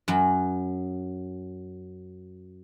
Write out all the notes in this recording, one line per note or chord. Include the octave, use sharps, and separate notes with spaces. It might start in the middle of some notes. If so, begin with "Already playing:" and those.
F#2 F#3